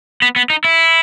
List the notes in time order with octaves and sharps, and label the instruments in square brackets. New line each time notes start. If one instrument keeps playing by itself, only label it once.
[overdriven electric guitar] B3
B3
D#4
E4